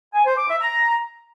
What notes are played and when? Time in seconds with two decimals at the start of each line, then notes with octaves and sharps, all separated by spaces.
0.13 G#5
0.25 C5
0.37 D6
0.49 E5
0.61 A#5